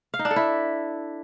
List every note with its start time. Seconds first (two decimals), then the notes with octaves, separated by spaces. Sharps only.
0.14 F5
0.19 D#4
0.25 D4
0.31 A4
0.36 E4